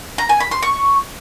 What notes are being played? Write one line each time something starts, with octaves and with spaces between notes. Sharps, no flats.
A#5
G#5
B5
C6
C#6